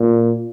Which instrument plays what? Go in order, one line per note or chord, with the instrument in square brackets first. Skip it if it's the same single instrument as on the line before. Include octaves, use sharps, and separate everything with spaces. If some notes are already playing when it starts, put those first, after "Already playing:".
Already playing: [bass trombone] A#2